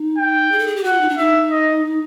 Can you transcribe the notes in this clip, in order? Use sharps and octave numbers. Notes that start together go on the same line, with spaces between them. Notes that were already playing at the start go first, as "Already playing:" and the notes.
Already playing: D#4
G5
G#4
A4
G#4
G4
F#4 F#5
F4
D#4
D4
D#4 E5
D#5